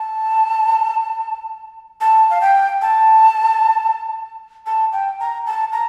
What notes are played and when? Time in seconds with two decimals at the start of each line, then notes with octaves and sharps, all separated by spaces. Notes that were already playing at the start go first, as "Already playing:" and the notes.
Already playing: A5
2.01 A5
2.31 F5
2.41 G5
2.82 A5
4.66 A5
4.93 G5
5.20 A#5
5.46 A5
5.73 A#5